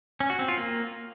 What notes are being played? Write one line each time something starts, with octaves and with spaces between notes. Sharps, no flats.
C#4
F#4
C4
F4
A#3